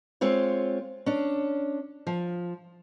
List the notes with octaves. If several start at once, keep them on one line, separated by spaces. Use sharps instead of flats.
G#3 C4 F4 C#5
C#4 D4
F3